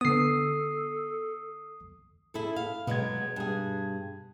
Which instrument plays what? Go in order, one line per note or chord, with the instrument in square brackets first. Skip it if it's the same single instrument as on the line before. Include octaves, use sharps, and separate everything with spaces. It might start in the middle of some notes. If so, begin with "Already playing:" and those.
[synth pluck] D3 B3 [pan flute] A4 [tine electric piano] D#6 C7
[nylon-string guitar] E4 G#4 A4
F5
[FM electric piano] B2 G#6 [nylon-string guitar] F#3 G#3 B3
[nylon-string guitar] G2 G#4